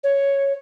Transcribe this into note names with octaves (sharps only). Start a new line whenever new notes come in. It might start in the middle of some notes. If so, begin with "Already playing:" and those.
C#5